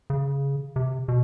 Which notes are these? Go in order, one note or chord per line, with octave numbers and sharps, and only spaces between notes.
C#3
C3
B2